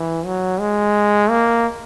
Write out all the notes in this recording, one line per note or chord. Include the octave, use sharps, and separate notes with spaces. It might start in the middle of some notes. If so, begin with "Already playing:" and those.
Already playing: E3
F#3
G#3
A#3